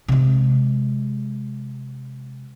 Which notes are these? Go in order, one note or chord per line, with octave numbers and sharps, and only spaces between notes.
C3 G#3